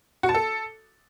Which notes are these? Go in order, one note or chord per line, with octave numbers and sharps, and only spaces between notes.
F#4
A5
A4